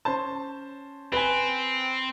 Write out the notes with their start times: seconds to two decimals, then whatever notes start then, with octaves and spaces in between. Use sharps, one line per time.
0.05 C#4 C5 A5
1.12 C4 B4 G#5